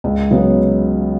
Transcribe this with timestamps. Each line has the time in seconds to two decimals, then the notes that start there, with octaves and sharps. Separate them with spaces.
0.04 C#2
0.31 C#3 F#3 B3